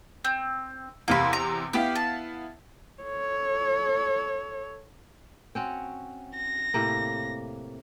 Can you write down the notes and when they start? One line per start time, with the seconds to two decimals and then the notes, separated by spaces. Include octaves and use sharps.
0.25 C4
1.08 E2 C3 A#3 B5 C6
1.33 A#5
1.73 B3 E4 G4 F5
1.95 A5
3.03 A4 C#5
5.55 C4 C#4 F#4
6.37 A#6
6.74 A2 C3 A#3